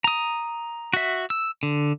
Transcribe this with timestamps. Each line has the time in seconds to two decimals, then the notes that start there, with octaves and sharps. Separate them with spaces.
0.04 A#5 D#6
0.94 F#4 E5
1.30 E6
1.63 D3